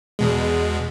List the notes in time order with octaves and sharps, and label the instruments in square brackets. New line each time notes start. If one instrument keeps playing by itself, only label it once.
[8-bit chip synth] E2 B2 G#3